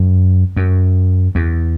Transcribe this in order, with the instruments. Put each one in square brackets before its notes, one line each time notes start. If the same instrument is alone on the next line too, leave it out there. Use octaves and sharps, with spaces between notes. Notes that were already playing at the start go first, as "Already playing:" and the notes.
Already playing: [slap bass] F#2
F#2
E2